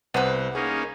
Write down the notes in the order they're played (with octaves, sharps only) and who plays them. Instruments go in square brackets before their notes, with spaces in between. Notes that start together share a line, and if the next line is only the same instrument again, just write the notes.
[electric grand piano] C2 C5 [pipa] B3 B4
[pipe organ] A#3 C#4 D#4 [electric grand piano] G#4